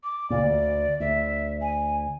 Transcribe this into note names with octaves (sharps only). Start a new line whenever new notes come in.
D6
C#2 A#2 D5
D2
D2 E5
G#5